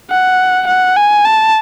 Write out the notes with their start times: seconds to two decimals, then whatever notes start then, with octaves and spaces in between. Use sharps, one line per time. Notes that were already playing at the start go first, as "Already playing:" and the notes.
0.11 F#5
0.68 F#5
0.97 G#5
1.25 A5